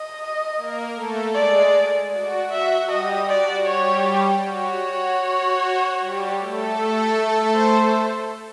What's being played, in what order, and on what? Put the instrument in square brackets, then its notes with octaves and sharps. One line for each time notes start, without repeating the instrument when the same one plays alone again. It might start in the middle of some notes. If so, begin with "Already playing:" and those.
Already playing: [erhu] D#5
[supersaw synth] A#3 A#4
A3 A4
[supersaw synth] G#3 G#4 [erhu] D5
[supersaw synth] F#4 [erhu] D5
[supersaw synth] F#4 [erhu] E5
[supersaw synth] G3 G4 [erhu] D#5
[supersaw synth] F#4 [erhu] D5
[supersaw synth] G3 G4 [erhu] C#5
[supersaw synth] F#4 [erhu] C#5
[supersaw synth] F#4
F#4
G3 G4
A3 A4
[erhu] C5